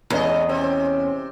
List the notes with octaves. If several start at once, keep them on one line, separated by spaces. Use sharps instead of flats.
E2 G#3 C#4 D#5
C3 C4 C#4